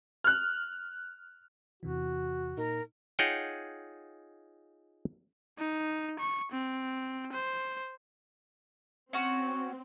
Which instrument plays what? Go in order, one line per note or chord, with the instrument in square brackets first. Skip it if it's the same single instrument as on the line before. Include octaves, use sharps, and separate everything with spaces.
[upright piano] F6 F#6
[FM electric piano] E2 C3 E3 [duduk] F#4
[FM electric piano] A#2 D#4 [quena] A#4
[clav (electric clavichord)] D#4 F4 G#4 C#5 F#5 G5
[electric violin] D#4
C#6
C4
C5
[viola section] C4 [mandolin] C#4 F#4